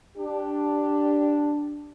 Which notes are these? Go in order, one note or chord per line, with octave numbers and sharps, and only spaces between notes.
D4 G4